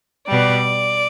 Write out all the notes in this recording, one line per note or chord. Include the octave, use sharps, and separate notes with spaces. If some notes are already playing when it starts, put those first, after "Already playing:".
B2 G3 D5